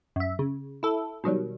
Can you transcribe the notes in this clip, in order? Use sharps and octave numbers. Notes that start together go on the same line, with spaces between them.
F#2 E5
C#3
E4 A4
B2 D#3 F#3 G3